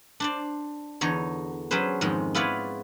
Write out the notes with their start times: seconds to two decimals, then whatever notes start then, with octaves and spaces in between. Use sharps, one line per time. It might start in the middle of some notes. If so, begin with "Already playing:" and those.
0.20 D4 C5 D5
1.01 E2 D3 D#4 C#5
1.71 F#3 C#4 G#4 B4 C5
2.01 F2 G#2 D#3 G#3
2.35 B3 E4 F4 B4 C#5 D5